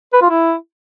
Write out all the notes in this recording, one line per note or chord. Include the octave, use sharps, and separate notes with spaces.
B4
F4
E4